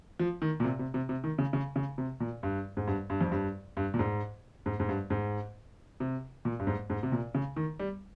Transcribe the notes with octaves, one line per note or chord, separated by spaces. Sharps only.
F3
D#3
A#2
C3
C3
C3
C3
D#3
C#3
C#3
C#3
C3
A#2
G2
G#2
G2
G2
F2
G2
G2
A#2
G#2
G#2
G#2
G2
G#2
C3
A#2
G2
G#2
G#2
C3
A#2
C#3
D#3
G3